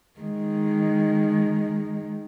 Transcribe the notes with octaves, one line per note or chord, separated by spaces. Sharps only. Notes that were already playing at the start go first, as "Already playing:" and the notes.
D#3 G#3